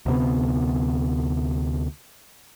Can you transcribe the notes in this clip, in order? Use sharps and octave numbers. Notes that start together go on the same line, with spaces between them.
D2 C3 B3